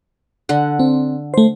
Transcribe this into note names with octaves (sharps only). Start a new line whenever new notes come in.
D3 F#5
C4
A3 C5